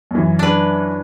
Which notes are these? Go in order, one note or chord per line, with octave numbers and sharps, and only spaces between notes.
F#2 E3
D4 B4